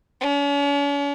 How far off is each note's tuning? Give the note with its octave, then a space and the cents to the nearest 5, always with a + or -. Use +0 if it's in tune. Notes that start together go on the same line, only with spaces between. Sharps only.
C#4 +45